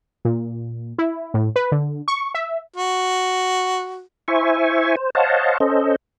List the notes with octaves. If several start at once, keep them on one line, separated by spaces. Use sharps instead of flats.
A#2
E4
A2
B4
D3
C#6
E5
F#4
E4 C5 E5 G#5 C#6
C5
C5 C#5 D#5 F5 F#5 A5
C#4 A4 C5 D#5